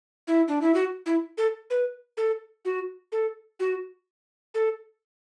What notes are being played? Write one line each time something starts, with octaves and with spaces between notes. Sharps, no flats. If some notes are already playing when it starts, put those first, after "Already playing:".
E4
D4
E4
F#4
E4
A4
B4
A4
F#4
A4
F#4
A4